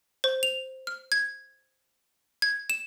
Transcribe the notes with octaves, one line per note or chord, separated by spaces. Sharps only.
C5
F7
F6
G#6
G#6
E7